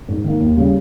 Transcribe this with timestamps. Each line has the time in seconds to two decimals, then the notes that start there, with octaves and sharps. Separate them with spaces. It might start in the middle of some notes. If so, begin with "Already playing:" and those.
0.09 G#2
0.24 D#3 A#3
0.40 D#2
0.57 C#3 G3